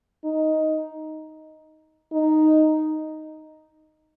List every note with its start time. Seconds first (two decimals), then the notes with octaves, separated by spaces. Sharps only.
0.25 D#4
2.13 D#4